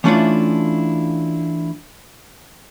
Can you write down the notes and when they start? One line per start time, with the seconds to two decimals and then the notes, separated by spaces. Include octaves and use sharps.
0.04 E3 A3 C#4 D4 E4 F4